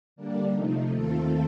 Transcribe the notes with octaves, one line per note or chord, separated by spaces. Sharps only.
D3 G3 A#3 D4
C3 F3 A3 D#4
D#2 D#3 A3 C4 F4 A4